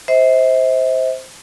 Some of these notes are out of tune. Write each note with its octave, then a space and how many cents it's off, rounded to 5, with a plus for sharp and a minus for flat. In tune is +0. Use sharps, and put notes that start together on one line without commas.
C5 +0 E5 -40